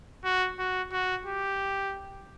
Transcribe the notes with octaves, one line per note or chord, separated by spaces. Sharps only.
F#4
F#4
F#4
G4